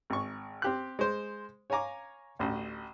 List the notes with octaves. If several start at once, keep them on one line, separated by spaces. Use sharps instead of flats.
G#1 C#6
C4 G4 F#6
G#3 C5
C#5 F5 G#5 A#5 D6
A1 D2